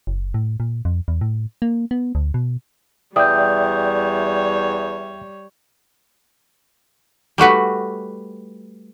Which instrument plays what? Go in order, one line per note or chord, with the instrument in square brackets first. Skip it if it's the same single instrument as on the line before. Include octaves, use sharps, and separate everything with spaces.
[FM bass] F#1
A2
A#2
F2
E2
A2
A#3
B3
D2
B2
[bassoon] E2 [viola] G3 C#5 [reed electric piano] D5 E5 G5 [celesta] D#6 G6
[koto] G3 A3 F#4 B4